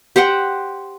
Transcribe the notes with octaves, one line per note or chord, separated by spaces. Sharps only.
G4 C5 F#5 G5